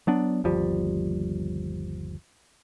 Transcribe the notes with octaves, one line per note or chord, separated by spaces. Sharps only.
F#3 B3 D4
G1 D#2 F3 G3